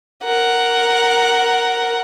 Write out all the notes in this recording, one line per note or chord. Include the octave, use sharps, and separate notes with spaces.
A#4 F#5